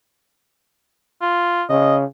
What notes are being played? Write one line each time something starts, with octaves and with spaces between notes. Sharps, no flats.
F4
C#3 D#5